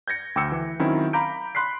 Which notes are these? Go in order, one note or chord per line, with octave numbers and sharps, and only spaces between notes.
G6 G#6 A#6 C#7
D2 G5 D6 E6 C#7
E3
D#3 F#3 C4 C#4 E4
F5 A#5 B5 D6 G6 D7
B5 C6 F#6 B6 C7